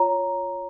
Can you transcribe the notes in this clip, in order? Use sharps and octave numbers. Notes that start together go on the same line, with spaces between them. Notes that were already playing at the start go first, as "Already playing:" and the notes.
Already playing: F4 C#5 A#5